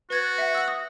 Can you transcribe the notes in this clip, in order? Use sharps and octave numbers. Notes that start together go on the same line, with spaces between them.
F#4 B4 G#6 A6
E5 F#5
E6 F#6
D#6